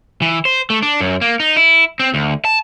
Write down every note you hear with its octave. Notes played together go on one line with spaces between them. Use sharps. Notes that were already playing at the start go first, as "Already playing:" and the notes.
E3
C5
A3
D4
F#2
A#3
D#4
E4
C4
D2
A5